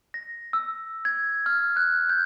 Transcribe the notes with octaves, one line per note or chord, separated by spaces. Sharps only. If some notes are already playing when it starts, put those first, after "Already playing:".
A#6
E6
G#6
F6
F#6
G6